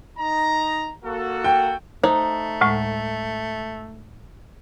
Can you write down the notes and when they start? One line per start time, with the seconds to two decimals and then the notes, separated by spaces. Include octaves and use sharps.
0.18 D#4 A#5
1.05 A#3 F#4 A4
1.44 G5
2.04 A3 D#4 C5
2.61 D2 A2 G#3